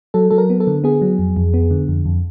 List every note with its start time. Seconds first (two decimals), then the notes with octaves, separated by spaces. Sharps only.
0.14 F#3 A4
0.31 F#3 A4
0.38 A#4
0.50 B3
0.60 A4
0.67 D3
0.84 B3 G#4
1.01 F#3
1.19 F2
1.36 F2
1.54 B3
1.71 D3
1.88 F2
2.05 F2